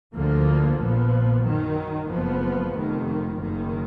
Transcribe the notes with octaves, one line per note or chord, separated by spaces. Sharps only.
D2 D3 F3 A#3
A#1 A#2 F3 B3
F#2 D#3 F#3
F#1 F2 F3 B3
F1 F2 D#3
F#1 F#2 D#3